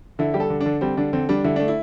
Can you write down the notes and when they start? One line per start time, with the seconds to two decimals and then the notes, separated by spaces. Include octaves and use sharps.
0.19 D3 E4
0.34 G3 G4
0.40 A4
0.50 D3
0.61 D4
0.66 D3
0.81 G3 C4
0.97 D3 D4
1.13 D3 C4
1.29 G3 D4
1.44 D3 E4
1.56 A3 D4
1.68 E4